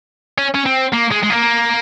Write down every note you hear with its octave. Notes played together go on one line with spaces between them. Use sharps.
C#4
C#4
C4
A#3
G#3
G#3
A#3